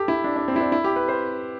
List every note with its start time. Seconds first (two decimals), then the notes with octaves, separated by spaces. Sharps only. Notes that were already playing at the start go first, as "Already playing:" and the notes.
Already playing: G4 A4
0.08 E4
0.24 D4
0.36 D4
0.48 C4
0.56 E4
0.60 D4
0.72 E4
0.84 G4
0.96 B4
1.08 C5